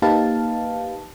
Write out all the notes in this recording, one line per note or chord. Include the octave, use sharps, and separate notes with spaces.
A#3 D#4 G4 B4 F5 A5